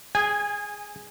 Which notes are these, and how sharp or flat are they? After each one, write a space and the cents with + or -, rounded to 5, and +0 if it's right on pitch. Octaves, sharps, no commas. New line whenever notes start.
G#4 +0 G#5 -20